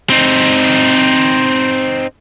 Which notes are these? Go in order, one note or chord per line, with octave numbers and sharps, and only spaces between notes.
C4 D#4